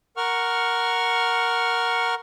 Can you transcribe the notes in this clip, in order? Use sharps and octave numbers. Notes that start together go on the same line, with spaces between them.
A#4 F#5 C#6 F6